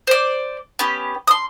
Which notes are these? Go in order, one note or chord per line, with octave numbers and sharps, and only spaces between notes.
C5 D5
B3 C#4 G4
C6 D#6